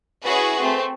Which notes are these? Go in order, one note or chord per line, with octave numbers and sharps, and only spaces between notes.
C#4 E4 F#4 G#4 B4
A3 C4